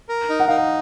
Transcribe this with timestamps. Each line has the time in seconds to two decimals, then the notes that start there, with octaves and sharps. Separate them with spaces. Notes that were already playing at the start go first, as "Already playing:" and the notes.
0.09 A#4
0.29 D#4
0.40 F#5
0.48 D#4 F5
0.57 F#5